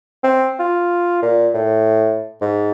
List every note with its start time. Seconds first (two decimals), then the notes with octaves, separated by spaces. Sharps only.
0.23 C4
0.59 F4
1.22 A#2
1.54 A2
2.41 G#2